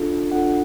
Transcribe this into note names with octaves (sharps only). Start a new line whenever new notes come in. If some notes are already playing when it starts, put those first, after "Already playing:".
Already playing: D4 F4 A4
D4 F4 A4 F#5